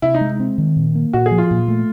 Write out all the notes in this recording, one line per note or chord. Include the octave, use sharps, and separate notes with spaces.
C3 E4
D#4
G#3
C4
D#3
A#2
A#3
A#2 F#4
G#4
F3
F4
A#2
A3